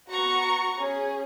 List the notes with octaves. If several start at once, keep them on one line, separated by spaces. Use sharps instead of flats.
B3 F#4 A#5 C#6
C#4 G#4